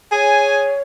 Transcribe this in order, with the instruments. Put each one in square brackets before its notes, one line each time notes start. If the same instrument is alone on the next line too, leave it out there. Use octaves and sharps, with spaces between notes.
[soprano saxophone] G#4 [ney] C#5 [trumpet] G#5